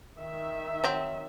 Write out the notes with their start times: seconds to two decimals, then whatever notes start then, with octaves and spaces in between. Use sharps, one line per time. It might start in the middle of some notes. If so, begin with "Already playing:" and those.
0.19 D#3 E5
0.84 F#3 C4